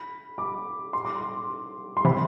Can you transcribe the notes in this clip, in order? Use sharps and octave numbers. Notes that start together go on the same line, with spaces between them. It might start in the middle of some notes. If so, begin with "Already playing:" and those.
Already playing: B5
D6
C6
D6
C6
C6
C3 E3 B5